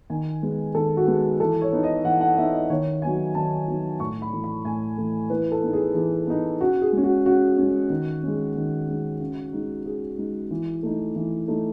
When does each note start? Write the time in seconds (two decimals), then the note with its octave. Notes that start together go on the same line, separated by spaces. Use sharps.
0.10 D#3 G#5
0.42 G#3 B3
0.75 D#3 A4
0.97 F#4
1.07 G#3 B3
1.40 E3 A4
1.62 C#5
1.72 B3 D#4
1.83 D#5
2.05 E3 F#5
2.21 F#5
2.37 B3 D#4 E5
2.54 D#5
2.70 D#3 C#5
3.02 F#3 B3 D#4 G#5
3.35 D#3 A5
3.67 F#3 B3 D#4
4.00 A2 C#6
4.22 B5
4.33 E3 A3
4.44 B5
4.65 A2 G#5
4.98 E3 A3
5.30 E3 B4
5.52 A4
5.63 B3 D#4
5.73 G#4
5.95 E3 G#4
6.27 B3 D#4
6.60 C#3 F#4
6.82 G#4
6.93 G#3 C#4
7.04 F#4
7.25 C#3 F#4
7.58 G#3 C#4
7.90 D#3
8.23 G#3 C#4
8.56 D#3
8.88 G#3 C#4
9.20 C#3
9.53 G#3 D#4
9.85 C#3 G#4
10.18 G#3 D#4
10.51 E3
10.83 A3 D#4
11.16 E3
11.48 A3 D#4